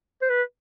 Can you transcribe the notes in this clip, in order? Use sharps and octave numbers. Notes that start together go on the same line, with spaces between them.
C5
B4